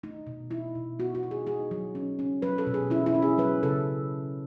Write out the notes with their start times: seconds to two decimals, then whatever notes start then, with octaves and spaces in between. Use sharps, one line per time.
0.03 A3 D#4
0.27 B2
0.51 D#4 E4
0.75 B2
0.99 B3 F#4
1.15 F#4
1.23 D#4
1.31 G#4
1.47 D#4 G#4
1.71 F#3
1.95 C#4
2.19 C#4
2.42 F#3 B4
2.58 A4
2.67 B2
2.74 G#4
2.90 C#4 E4
3.06 E4
3.15 C#4
3.22 G#4
3.38 F#3 B4
3.63 C#3 A4